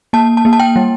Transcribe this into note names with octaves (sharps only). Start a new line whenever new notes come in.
A#3 A5
A5
A#3
A5
G5
G3